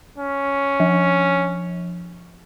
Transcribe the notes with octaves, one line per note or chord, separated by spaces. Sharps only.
C#4
F3